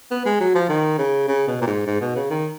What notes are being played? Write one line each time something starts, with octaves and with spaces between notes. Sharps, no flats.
B3
G#3
F#3
F3
D#3
C#3
C#3
B2
A#2
G#2
G#2
B2
C#3
D#3